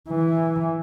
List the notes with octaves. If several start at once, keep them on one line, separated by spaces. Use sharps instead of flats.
E3